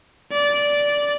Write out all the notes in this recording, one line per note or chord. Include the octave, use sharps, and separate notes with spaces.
D5